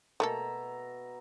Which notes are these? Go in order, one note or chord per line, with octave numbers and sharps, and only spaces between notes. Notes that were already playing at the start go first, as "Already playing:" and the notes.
B2 A3 A#3 A4 E5 A#5